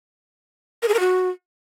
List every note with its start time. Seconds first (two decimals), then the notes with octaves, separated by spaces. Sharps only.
0.83 A#4
0.88 G#4
0.94 A#4
1.00 F#4